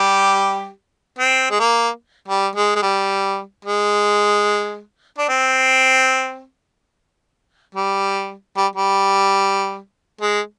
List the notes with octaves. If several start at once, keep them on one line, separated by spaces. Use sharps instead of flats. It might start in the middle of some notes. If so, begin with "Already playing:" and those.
Already playing: G3 G4
C4
G#3
A#3
G3
G#3
G#3
G3
G#3
D4
C4
G3
G3
G3
G#3